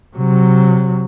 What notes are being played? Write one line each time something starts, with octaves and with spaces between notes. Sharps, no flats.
C3 F#3